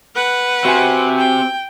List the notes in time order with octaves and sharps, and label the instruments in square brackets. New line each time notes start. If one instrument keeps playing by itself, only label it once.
[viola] B4 F#5
[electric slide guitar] C4 G4 C5 [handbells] F#4 E5 G#5
[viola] G5